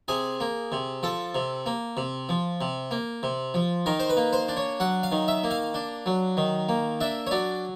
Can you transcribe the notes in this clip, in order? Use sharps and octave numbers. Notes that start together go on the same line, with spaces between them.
C3 G#4
A#3
C3
F3 A4
C3
A#3
C3
F3
C3
A#3
C3
F3
D#3 A#4
C5
B4
A#3
C5
D4
C#5
F#3 F#5
F5
D#3
E5
A#3
F5
D4
F#3
D#3
A#3
D4 E5
C#5
F#3 D5